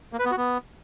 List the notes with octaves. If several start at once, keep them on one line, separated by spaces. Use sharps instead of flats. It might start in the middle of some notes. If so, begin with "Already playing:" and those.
A#3
B4
B3
F#4
B3